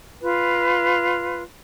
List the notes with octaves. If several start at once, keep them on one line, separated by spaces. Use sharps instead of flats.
F4 B4